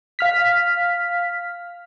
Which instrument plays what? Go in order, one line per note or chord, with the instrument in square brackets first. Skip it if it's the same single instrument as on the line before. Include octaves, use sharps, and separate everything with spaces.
[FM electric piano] F5 F6 B6